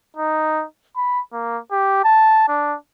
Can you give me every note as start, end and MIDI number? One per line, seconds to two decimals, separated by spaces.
0.17 0.65 63
0.96 1.21 83
1.33 1.58 58
1.72 2.01 67
2.04 2.46 81
2.48 2.76 62